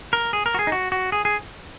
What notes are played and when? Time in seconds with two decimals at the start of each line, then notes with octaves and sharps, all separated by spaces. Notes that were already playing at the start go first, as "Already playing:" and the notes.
0.13 A#4
0.33 G#4
0.46 A#4
0.54 F#4
0.59 G#4
0.67 D#4
0.72 F#4
0.92 F#4
1.12 G#4
1.25 G#4